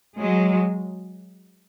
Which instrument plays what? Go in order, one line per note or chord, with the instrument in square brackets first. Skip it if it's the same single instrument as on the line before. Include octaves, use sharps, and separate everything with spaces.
[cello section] F#3 G#3